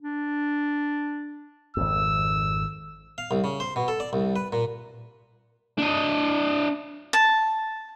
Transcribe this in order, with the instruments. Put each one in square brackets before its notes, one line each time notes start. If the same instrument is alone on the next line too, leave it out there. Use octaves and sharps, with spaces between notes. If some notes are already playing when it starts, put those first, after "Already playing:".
[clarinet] D4
[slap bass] G#1 F2 [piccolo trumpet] E6
[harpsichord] F5
C2
C#3
C5
B2
A4
D5
C2
B4
A#2
[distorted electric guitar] D4 D#5
[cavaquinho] A5